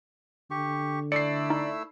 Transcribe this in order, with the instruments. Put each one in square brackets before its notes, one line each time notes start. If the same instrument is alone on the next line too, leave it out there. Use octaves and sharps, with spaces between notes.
[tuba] D3 [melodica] G4 C#6
[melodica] A3 E4 E6 [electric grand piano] D5 C7 [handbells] C#7
[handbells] D#4